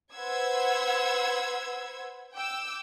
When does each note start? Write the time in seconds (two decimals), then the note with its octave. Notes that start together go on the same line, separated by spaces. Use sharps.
0.14 B4 C5 F#5 E6 G#6
2.34 G5 D6 E6